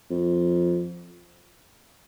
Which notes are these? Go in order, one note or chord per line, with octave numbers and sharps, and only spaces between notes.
F2